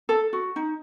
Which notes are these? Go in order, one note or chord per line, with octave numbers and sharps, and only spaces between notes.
A4
F#4
D#4